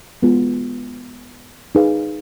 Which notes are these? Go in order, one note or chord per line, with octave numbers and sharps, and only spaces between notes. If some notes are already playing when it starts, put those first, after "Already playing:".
G#3 B3 F4
D#4 G#4 B4 F5